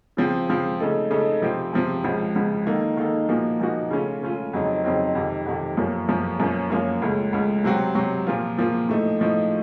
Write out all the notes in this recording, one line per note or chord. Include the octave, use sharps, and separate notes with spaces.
C#3 F3 C4
C#3 F3 C4
C#3 A3 D#4 A4
C#3 A3 D#4 A4
C3 F3 C4
C3 F3 C4
C#2 C#3 F3
C#2 C#3 F3
D#3 A#3 D#4 A4
D#3 A#3 D#4 A4
A#2 F3 A#3 D#4 F#4
A#2 F3 A#3 D#4 F#4
C#3 A3 C#4 F4
C#3 A3 C#4 F4
F2 C#3 F#3 C4 D#4
F2 C#3 F#3 C4 D#4
F2 C3 D#3
F2 C3 D#3
F#2 F3 A#3
F#2 F3 A#3
F#2 F3 A#3 C#4
F#2 F3 A#3 C#4
C#2 C#3 A3
C#2 C#3 A3
C3 F#3 C4 F#4
C3 F#3 C4 F#4
A#2 F3 A#3 F4
A#2 F3 A#3 F4
A2 F3 A3 D#4
A2 F3 A3 D#4